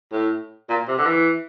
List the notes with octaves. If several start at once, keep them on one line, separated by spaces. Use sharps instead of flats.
A2
A#2
C3
D3
E3